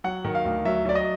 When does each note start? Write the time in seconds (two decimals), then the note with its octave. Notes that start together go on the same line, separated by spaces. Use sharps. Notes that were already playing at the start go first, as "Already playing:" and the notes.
0.04 F#3 F#5
0.25 D#3
0.35 F5
0.45 D2
0.65 F#3 E5
0.85 F#3 D5
0.95 D#5